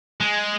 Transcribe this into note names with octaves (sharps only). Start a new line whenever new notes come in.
G#3